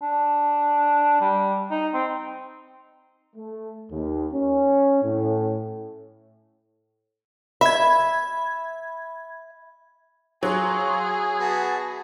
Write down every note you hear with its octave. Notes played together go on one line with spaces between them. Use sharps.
D4
G3
D#4
C4
A3
D#2
C#4
A2
E5 B5 G#6
F#3 G#4 F5 C6 C#6
B3 F#4 E5 A5